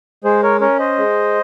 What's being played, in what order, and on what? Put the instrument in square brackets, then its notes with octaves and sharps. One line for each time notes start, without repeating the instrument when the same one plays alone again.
[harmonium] G#3 [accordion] G#4 C5
[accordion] A#4 C#5
[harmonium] C#4 [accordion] A#4 C#5
[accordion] C5 D#5
[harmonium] G#3